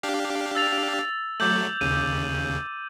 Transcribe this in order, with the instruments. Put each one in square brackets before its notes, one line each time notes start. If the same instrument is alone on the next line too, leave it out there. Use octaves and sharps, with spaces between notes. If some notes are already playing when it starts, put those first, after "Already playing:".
[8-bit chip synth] D4 G4 F5
[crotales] E6 A6 F7
[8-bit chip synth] F#3 A3 [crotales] D6 G6 F#7
[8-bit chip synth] D#2 C#3 [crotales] D#7